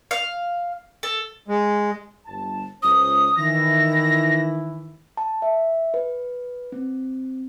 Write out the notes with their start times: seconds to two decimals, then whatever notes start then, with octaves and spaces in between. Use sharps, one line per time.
0.11 F5
1.03 A4
1.48 G#3
2.27 G1 A5
2.82 C#2 C5 D#6
3.37 D#3 E3 E4 A#6
5.17 A5
5.42 E5
5.94 B4
6.72 C4